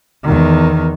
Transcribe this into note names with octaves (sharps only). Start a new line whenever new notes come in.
E2 D#3